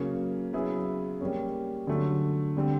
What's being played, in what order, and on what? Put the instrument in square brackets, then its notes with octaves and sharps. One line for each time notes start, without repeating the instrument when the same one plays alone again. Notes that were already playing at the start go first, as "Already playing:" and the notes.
Already playing: [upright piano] C#3 F#3 A#3
C#3 F#3 B3 E4 G#4
G3 A#3 C#4
D3 F#3 A3
D3 G3 C4